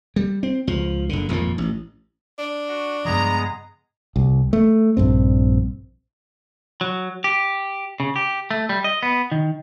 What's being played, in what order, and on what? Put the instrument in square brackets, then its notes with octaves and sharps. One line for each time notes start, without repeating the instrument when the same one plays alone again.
[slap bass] G3
C4
C#2 F3
F#1 D3
G#1 F2 A#2 A#3
A1
[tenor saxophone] D4
[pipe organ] F#4
[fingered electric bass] G2 C#3 F3 [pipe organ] G#3 B3 G#4 [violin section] A#5
[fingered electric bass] C2
A3
A#1 G2 C4
[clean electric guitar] F#3
G4
C#3
G4
A3
G3
D#5
B3
D#3